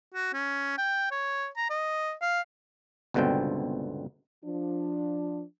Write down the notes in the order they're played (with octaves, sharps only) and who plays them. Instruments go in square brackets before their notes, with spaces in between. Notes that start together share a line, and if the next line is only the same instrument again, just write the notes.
[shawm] F#4
C#4
G5
C#5
A#5
D#5
F5
[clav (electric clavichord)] G1 C#2 B2 D3 C4 G5
[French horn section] F3 D4